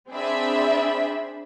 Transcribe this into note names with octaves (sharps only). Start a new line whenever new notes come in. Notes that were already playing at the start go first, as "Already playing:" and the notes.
C4 D4 G#4 D5 E5 B5